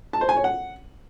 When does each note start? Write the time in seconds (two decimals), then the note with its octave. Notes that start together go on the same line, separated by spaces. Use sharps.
0.13 A5
0.21 C5
0.29 G#5
0.36 C#5
0.44 F#5